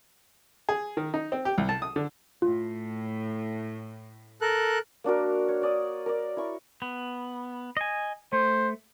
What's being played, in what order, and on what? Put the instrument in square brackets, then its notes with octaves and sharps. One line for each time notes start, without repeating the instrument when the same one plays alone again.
[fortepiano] G#4
D#3
D#4
C4
G4
C2
A5
D#6
D3
[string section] A2 [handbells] F4
[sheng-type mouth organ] A4 A#4 F#6
[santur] A#3 D4 F#4 A#4
C#5
C#5 D5 D#6
A#4 D5
E4 C#6
[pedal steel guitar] B3
D#5 G#5
[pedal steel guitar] A3 [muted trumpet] C5